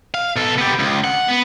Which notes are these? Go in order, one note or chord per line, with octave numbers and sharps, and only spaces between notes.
F5
B2 A4
B3 G4
C#2
F#5
B3